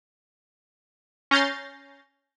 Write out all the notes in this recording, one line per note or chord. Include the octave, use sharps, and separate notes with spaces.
C#4 A#5 G6 A6 C7